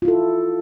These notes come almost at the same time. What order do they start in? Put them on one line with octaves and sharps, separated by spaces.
F4 E4 A4